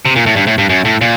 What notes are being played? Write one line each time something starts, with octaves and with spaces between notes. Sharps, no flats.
C3
A#2
A2
G2
A2
G2
F#2
A2
A#2